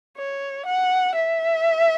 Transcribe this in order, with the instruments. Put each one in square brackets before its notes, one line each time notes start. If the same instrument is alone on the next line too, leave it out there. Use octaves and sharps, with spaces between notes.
[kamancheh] C#5
F#5
E5